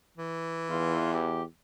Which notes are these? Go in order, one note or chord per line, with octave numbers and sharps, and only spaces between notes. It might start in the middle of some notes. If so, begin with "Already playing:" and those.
E3
E2 F4
G4